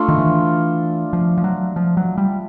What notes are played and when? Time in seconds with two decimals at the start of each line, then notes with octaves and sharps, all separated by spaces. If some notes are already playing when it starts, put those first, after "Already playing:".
Already playing: A3 D4 F4
0.09 D#3
0.18 E3
1.13 F3
1.38 F3
1.44 F#3
1.76 F3
1.97 F#3
2.18 G3